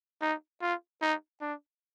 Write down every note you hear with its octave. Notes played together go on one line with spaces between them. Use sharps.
D#4
F4
D#4
D4